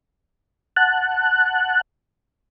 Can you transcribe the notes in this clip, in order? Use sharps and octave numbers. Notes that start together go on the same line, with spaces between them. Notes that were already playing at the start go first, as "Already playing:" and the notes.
F#5 A5 F#6